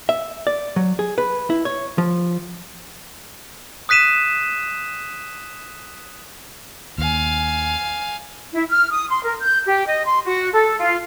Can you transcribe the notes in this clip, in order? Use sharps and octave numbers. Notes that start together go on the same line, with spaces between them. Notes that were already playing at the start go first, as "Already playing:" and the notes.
E5
D5
F#3
G#4
B4
E4
C#5
F3
D#6 F#6 B6 D#7 E7
D#2 F5 G#5
E4
F6
D#6
C6
A#4
G6
G4
D#5
C6
F#4
A4
F4